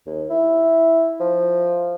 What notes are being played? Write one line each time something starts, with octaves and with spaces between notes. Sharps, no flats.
D#2
E4
F3